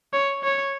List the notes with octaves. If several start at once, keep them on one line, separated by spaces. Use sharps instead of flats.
C#5
C#5